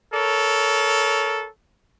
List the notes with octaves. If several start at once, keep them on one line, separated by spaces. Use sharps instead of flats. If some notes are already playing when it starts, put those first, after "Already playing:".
A4 A#4 C#5